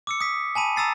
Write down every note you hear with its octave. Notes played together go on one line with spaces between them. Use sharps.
D6 E6 C#7
D#6 B6
G#5 A5 B5 D#7
A#5 D#6 E6 A6 C7